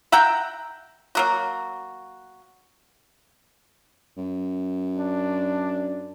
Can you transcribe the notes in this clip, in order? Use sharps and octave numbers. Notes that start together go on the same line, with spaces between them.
E5 F#5 G5 A#5
F#3 A#3 F#4
F#2
D4